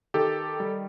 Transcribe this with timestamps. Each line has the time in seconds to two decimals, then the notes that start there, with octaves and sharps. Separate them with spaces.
0.14 D#3 G4 A4
0.60 G3